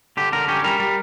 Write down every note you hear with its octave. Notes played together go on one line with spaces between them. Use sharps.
D3 G4
D3 A#4
C#4 G4
G3 A#4
G3